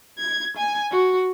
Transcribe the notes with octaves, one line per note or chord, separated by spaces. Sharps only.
G#6
G#5
F#4